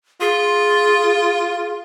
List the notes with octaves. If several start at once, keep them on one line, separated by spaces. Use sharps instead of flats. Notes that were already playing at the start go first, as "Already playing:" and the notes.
F4 G#4